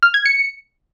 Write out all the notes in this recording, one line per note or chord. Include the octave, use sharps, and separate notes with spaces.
F6
G#6
C#7